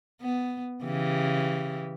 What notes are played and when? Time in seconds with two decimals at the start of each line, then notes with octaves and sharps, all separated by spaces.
0.22 B3
0.84 C#3 E3 G4